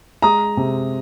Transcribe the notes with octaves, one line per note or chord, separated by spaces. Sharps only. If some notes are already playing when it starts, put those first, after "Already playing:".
G#3 A#5 D#6
C3